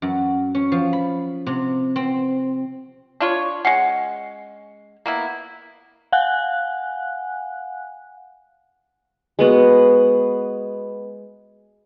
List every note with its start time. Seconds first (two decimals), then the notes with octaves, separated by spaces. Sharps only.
0.02 F#2
0.55 C#4
0.72 F3
0.93 B5
1.47 C3
1.96 C4
3.20 D4 F4 C#5
3.65 G#3 C#4 F#5 C7 C#7
5.06 A#3 B3 E4
6.12 F5 F#5 G#5 F#6
9.39 G#3 B3 F#4